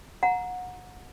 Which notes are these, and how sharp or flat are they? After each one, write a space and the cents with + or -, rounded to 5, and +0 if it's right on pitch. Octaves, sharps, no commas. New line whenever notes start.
F#5 -25 A#5 +5